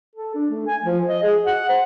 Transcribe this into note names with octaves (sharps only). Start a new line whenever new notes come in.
A4
D4
A3
G#5
F3
D#5
G#4
F#5
C5